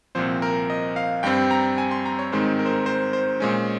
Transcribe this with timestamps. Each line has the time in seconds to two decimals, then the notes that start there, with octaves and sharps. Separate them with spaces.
0.15 C2 A#2 F3 C4 C5
0.42 A#4
0.70 D#5
0.96 F5
1.23 G2 G3 C4 G5
1.51 A#5
1.78 G#5
1.91 C6
2.06 A#5
2.19 C#5
2.32 G#2 D#3 G#3 C4 C5
2.59 A#4
2.66 C5
2.73 A#4
2.86 C5
3.13 C5
3.40 A#2 G#3 C#4